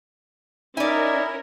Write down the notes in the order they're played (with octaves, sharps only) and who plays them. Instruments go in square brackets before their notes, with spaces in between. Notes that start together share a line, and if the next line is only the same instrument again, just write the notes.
[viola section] C#4 A#4 [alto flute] D#4 [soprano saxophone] E4 [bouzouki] D5 G#5